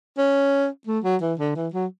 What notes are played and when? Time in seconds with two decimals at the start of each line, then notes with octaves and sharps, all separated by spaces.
0.18 C#4
0.87 A3
1.04 F#3
1.21 E3
1.39 D3
1.56 E3
1.74 F#3